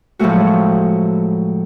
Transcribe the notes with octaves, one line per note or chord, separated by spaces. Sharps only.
A2 F3 F#3 G#3 A3 F#4